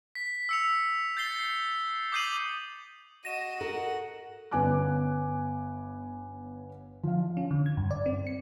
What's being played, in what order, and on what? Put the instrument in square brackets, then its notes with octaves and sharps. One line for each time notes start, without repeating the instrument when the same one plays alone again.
[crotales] B6
E6 C#7 F7
G6 A6 C7 G7
D6 D#6 G6 C7 D#7 F#7
[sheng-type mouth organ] F#4 [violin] D#5 D#7 [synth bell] A#6 E7
[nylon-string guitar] A4 A#4 [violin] F#5
[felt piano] G1 B3 C#4 G#5 D6 F#6
F3 F5
[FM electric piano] C#4
D3
G#6
G2
D5
C4
C#7